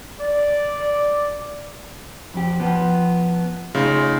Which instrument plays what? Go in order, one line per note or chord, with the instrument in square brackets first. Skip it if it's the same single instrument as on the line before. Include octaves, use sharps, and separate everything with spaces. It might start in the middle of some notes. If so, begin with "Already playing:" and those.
[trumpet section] D5
[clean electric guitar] F2 G4
F3 B3
[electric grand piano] C#3 [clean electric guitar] A3 D#4 F4